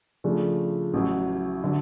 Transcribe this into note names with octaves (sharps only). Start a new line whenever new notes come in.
C#3 F3 A3 D4
A1 A2 F#3
D3 F#3